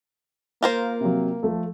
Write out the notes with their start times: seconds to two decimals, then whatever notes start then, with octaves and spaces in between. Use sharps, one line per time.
0.62 A#3 F4 A#4 C5
1.01 C3 F#3
1.43 F3 A3 A4